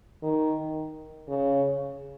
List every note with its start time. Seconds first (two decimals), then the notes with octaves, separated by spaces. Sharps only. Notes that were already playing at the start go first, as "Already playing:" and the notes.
0.23 D#3
1.28 C#3